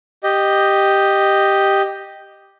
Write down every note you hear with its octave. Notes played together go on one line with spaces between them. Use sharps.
G4 D#5